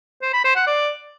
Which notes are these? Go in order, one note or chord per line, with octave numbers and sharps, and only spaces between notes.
C5
B5
C5
F#5
D5